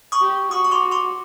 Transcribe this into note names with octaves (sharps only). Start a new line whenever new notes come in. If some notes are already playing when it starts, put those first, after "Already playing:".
C#6 D#6
G4
F#4 C#6 D#6
C#6
C6 D6
C6 D6